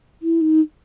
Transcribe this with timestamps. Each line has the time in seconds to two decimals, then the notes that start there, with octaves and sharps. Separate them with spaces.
0.22 E4
0.41 D#4